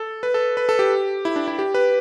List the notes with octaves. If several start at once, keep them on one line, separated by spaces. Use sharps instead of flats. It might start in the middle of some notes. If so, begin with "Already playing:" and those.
Already playing: A4
B4
A4
B4
A4
G4
E4
D4
E4
G4
B4